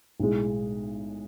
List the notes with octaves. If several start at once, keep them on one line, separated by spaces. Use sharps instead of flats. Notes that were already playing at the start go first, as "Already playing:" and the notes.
B1 A2 G#3